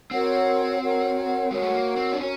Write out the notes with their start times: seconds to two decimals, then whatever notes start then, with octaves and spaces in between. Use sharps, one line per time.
0.11 C4 F#4 A#4 C#5 F#5
0.82 F#4 A#4 C#5 F#5
1.51 G#3 F#4 A#4 C#5 F#5
1.62 A3
1.74 A#3
1.96 C4
2.13 D4
2.20 C#4 F#4 A#4 C#5